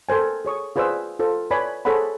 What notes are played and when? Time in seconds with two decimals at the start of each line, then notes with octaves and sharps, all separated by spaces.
0.09 A4 A#4 C5 G#5
0.45 G#4 C#5 C#6 D#6
0.76 F4 G#4 B4 C5 D5 E6
1.19 F4 A4 C5
1.51 B4 C#5 D5 G#5 B5
1.85 G#4 A4 C5 C#5 F#5 B5